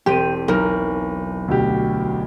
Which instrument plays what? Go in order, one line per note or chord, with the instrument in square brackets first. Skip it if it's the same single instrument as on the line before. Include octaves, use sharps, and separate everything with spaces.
[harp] E1 C4 D#7 [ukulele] G4
[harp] B1 [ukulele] D#4 A#4
[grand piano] D2 B2 G4